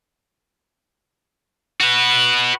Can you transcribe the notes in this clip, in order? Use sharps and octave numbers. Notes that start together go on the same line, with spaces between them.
F#4 B4